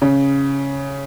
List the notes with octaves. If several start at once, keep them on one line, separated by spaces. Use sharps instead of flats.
C#3